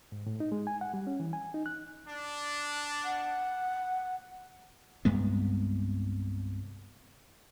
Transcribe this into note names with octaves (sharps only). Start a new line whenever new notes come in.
G#2
A2
D#4
G#3
G#5
F#5
G3
C#4
E3
G#5
D#4
F#6
D4
F#5
C2 G2 G#3 B3